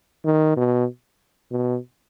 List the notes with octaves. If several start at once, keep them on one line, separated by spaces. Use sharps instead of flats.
D#3
B2
B2